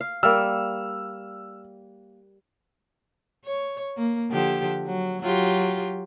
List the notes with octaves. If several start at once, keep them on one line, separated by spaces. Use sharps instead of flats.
F5
G3 A#3 E6 F6
C#5
A#3
D3 F3 G4
F#3
F#3 F4 G4